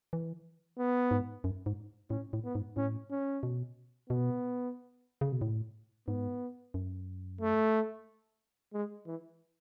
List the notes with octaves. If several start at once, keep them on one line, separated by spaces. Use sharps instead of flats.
E3
B3
G#2
F#2
G#2
A2 C#4
A2
B3
G#2
A2 C#4
C#4
B2
B2 B3
C#3
B2
A2
G#2 B3
F#2
A3
G#3
E3